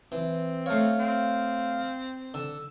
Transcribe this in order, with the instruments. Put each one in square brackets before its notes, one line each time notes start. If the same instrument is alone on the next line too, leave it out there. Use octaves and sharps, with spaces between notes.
[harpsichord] E3 [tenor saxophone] C4
[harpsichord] A3 C#5 [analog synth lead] F5
[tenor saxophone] C4
[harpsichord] D3 [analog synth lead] E6